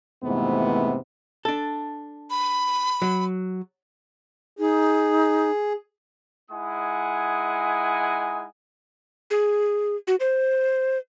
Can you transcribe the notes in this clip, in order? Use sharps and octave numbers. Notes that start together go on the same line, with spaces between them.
F2 G#2 C3 E3 A3 B3
D4 A4
B5
F#3
D#4 G#4
G#3 D#4 E4 F#5 G#5 D#6
G#4
F#4
C5